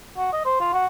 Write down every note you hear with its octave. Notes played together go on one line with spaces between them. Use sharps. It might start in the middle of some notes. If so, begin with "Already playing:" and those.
F#4
D#5
C5
F4
F#4